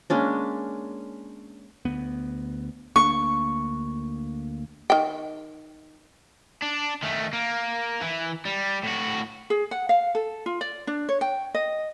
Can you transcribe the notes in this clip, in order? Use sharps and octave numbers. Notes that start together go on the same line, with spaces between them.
G#3 A#3 C#4 D4
D2 B3
D2 A#3 D4 C#6
D#3 G5
D4
D#3 A3
A#3
E3
G3
A2 F#4
G#4
F#5
F5
A4
F4
D5
D4
C#5
G5
D#5